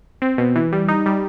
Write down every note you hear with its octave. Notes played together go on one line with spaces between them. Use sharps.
C4
B2
E3
G3
D#4
G3